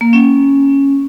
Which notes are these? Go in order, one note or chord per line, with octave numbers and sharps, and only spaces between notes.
A#3
C#4